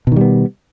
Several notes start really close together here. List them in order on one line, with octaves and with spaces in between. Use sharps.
B2 D#3 G3 B3